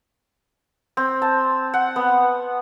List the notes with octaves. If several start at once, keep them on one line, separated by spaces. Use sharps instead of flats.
C4
A5
F#5
B3